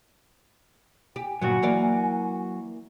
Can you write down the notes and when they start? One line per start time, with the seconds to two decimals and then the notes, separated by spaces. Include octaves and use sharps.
1.16 G4 G#5
1.42 D2 G2 A#2 F#3 F#4
1.62 E3 A#3 D5